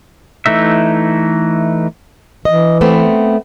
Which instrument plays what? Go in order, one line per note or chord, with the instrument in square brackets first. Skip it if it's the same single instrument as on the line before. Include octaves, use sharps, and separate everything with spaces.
[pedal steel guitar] E3 A3 D#4 E5
[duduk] E3 [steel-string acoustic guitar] D#5
[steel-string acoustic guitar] A3 B3 C4